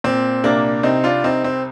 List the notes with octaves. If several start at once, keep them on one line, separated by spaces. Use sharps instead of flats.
A#2 C4
C2 A#3 D4
C2 C4 D#4
D4 F4
C2 C4 D#4
C4